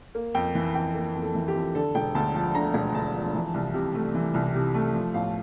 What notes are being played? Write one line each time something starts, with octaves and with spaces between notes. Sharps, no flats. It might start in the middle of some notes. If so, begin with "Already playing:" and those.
A#3
F2 G5
E3
F2 G5
A#3
F2
A4
E3
G4
F2
D3 A4
E1 G5
D2 A5
F3 A5
D3 A#5
E1
D2 A5
F3
E3
C2
C3
A3
E3
C2
C3
A3
F3
A1 F5